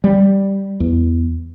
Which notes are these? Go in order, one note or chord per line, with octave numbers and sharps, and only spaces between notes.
G3
E2